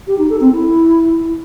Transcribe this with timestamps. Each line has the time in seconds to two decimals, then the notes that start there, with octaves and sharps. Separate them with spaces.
0.07 G4
0.18 D#4
0.30 A4
0.41 C4
0.52 E4